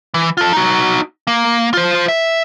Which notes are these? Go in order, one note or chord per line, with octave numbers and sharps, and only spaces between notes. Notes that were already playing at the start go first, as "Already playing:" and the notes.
E3
F4 A4
D#4 F#4
A#3
F4 C5
E5